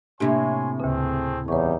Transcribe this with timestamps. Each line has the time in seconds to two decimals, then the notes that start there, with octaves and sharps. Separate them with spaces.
0.20 A2 C3 A#3 D4 G4 C#5 G#5 C6
0.80 D2 C#3 A3 C4 G#4
1.48 E2 G3 D#4 G4 C#5 C#6